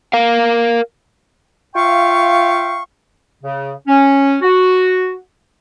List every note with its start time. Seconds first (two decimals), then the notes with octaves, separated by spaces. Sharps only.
0.13 A#4 F5
1.75 F4 E5 F5 G5 C#6
3.42 C#3
3.87 C#4
4.41 F#4